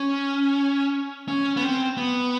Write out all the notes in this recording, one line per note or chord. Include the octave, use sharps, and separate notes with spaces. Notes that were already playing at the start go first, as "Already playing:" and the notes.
Already playing: C#4
C#4
B3
C4
B3